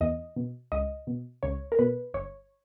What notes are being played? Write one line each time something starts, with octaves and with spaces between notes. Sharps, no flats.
E2 D#5
B2
C#2 D#5
B2
C#2 C#5
A#4
B2 B4
G1 C#5